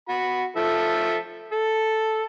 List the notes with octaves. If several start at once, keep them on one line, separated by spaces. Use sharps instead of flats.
F#4 B5
F3 A4 E5
A4